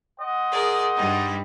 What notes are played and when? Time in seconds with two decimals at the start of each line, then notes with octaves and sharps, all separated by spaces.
0.19 C5 D#5 F#5
0.51 G#4 A#4 D5
0.96 G2 G3 D#4